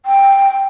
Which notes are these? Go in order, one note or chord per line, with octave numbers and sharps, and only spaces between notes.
G5